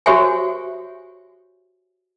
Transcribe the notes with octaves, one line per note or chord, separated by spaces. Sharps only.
F#4 G4 C5 C#5 E5 G#5